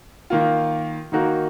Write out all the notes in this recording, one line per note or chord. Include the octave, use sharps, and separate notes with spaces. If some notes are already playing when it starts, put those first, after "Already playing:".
D#3 A#3 F4
D#3 A#3 D#4 F#4 A#4